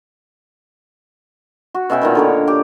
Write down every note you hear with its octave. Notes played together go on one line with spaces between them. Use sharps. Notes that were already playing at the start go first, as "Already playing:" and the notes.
F#4
B2 C#4 E5 G5
A#2 D#3 B3
D3 A#4 C#5
G4